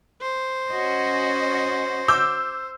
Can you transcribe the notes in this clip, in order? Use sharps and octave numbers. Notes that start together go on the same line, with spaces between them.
C5
C#4 F#4 D#5
D6 E6 G6